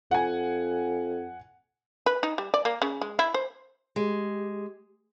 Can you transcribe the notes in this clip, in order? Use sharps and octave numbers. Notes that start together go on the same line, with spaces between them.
F2 F#5 G#5
B4
D#4
G3
D5
A#3
C#3
G#3
E4
C5
G#3 G4